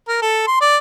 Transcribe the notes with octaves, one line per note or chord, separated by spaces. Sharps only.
A#4
A4
C6
D5